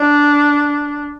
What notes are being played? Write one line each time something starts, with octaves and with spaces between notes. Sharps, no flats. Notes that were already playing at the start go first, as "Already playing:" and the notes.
Already playing: D4